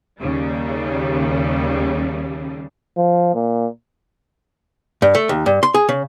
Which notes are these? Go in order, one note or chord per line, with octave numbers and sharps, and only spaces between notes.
D#2 C#3 G3
F3
A#2
G2
A3
D#2
G2
C6
G#4
C#3